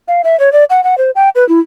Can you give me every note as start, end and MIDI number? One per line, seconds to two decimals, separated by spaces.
0.08 0.22 77
0.24 0.38 76
0.40 0.52 73
0.53 0.64 74
0.70 0.84 78
0.84 0.98 78
0.98 1.11 72
1.16 1.29 79
1.35 1.47 71
1.49 1.60 64